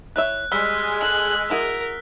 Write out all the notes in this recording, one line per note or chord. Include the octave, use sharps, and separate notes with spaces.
E4 C#5 E5 F#6
G3 G#3 C5 E6 F6 B6
A4 F#6
E4 F#4 G#4 A#4